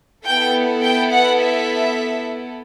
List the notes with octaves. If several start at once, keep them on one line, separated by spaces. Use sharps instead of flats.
B3 E4 A4 G5
G5
F#5
E5